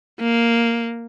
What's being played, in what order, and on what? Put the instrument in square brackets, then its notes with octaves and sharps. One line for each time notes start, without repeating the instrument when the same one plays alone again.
[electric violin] A#3